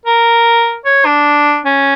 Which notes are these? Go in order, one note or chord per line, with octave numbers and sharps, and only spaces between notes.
A#4
C#5
D4
C#4